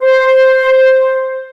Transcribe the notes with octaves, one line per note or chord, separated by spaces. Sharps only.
C5